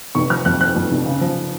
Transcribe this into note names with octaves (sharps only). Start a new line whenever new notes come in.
F1 C#6
F3 F6
F2 F#6
F3 F#6
F2
F1
C#3
F3